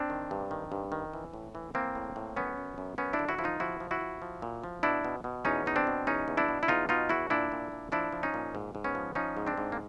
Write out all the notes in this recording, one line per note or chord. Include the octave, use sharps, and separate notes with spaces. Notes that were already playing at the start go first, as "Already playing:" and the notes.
Already playing: C4 D4
D#3
G2
D#3
G2
D#3
E3
A2
E3
E3 A#3 C4
A2
A2
F#2 B3 C#4
F#2
F#2
F#2 B3 C#4
D4 E4
D3
E4 F#4
F3 E4
D#4 F4
F3 E4 F#4
F3
E4 F#4
F3
F3
A#2
F3
B2 D4 E4
B2
B2
E2 C#4 D#4
B2 D#4
C4 D4
B2
E2 C#4 D#4
E2
D4 E4
B2
E4
E2 D#4 F4
B2 D#4 F4
E2 E4 F#4
A#2 D4 E4
A#2
A#2
F3 D4 E4
F3
C#4 D#4
A#2
G#2
G#2
B3 C#4
F3
F3 C#4 D#4
G#2
C4 D4
G#2
A#3